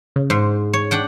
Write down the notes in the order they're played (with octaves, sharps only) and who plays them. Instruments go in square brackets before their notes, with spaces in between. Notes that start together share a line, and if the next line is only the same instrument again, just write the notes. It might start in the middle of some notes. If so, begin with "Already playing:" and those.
[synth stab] C#3
[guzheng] G#2 [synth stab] C5
[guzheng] C#5
D4 F#5 G5